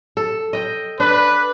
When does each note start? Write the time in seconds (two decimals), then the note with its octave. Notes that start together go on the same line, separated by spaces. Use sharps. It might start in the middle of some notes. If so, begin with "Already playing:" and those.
0.17 A4
0.53 D#5 G5
1.00 D4 B4